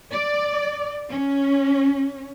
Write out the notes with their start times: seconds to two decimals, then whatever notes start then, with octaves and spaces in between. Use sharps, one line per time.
0.12 D5
1.11 C#4